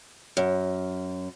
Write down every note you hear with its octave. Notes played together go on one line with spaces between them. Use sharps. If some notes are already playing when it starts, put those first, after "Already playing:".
F#2